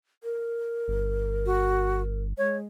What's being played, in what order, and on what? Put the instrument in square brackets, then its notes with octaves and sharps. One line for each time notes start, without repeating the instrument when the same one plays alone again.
[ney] A#4
[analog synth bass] G1
[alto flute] F#4
[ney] G#3 [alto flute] C#5